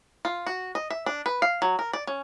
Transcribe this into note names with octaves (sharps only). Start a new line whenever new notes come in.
F4
F#4
D#5
E5
D4
B4
F5
F#3
A#4
D5
C#4